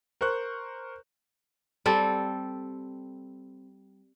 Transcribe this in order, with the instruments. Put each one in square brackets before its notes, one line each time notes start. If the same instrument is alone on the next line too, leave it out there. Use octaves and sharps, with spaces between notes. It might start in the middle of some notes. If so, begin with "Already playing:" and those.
[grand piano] A#4 C5 C#6 F#6
[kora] G3 C4 A4